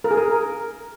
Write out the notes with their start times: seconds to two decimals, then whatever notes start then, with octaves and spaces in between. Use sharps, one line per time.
0.04 A#4
0.11 G#4
0.17 A#4